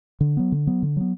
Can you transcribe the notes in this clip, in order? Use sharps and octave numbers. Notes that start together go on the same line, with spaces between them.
D3
F#3 B3
D3
F#3 B3
D3
F#3 B3